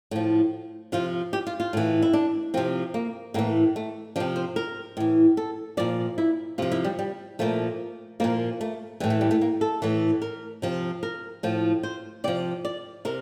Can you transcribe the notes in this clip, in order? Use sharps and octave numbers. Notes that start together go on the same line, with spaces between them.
A2 F3
C3 F3 F4
G4
F4
F4
A2 E3
E4
D4
C3 F3 C4
A#3
A2 E3 A#3
A3
C3 F3 D4
C5
A#4
A2 E3
A4
A#2 F3 D5
E4
C3 F3 F4
E4
G3
G3
A#2 F3 A3
A#2 F3 A#3
A3
A2 E3 G3
A3
G3
A3
A#3
A4
A2 E3
A#4
C3 F3
A#4
A2 F3
C5
C3 F3 D5
D5
C3 A#4